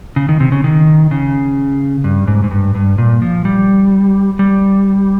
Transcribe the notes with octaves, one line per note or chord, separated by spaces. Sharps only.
C#3
D#3
C3
C#3
D#3
C#3
G2
G#2
G#2
G2
G2
A#2
F3
G3
G3